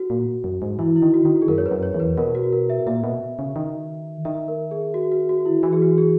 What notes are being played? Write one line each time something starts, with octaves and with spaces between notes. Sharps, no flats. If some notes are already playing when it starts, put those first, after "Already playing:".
Already playing: F#4
A#2
F#2
G#2
E3 E4
E4
D#3
F#4
D#3
G#4
F#2 A#4
C#5
B4
F#2
C#5
E2
B4
B2 A#4
F#4
A#4
E5
A#2 E5
B2
C#3
D#3
D#3 E5
A#4
G#4
F#4
F#4
F#4
E4
E3 F#4
G#4
F#4
G#4